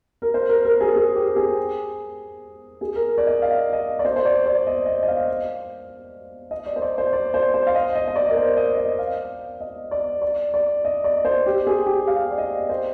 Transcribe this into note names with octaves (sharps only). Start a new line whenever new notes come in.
A#4
C5
A#4
A#4
G#4
G#4
G4
G#4
G#4
A#4
D5
D#5
F5
D#5
D5
C5
C5
D5
D5
D#5
D#5
D#5
F5
D#5
D5
C5
D5
C5
D5
C5
C5
F5
D#5
D#5
D#5
D5
A#4
C5
D#5
D#5
F5
D#5
D5
D5
D5
D#5
D5
C5
G4
G#4
G4
F5
D5
D#5
C5